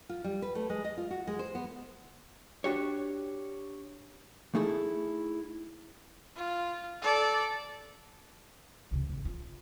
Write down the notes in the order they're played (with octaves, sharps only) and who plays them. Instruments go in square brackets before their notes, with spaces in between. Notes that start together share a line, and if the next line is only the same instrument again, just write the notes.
[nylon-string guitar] F4
G3
B4
A3
G#3
D#5
F4
F#4
G#3
C5
B3
[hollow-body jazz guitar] D4 F#4 G4 C#5
A3 D#4 E4 G#4 A4
[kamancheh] F4
A4 D5
[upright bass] C#2 C3
G#1 D2
F4